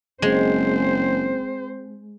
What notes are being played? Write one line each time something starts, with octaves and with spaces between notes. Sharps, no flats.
F#1 G#3 C4 C5